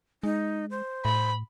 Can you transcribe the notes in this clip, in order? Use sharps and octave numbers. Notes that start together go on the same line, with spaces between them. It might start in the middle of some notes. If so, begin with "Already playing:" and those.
G#3 D#4
C5
A2 B5